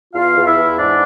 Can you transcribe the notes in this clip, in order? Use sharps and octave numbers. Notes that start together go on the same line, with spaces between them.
E2 F4 F5
E2
E4 E5
E2
G#2 D4 D5